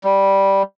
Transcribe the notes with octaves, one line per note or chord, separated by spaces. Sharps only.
G3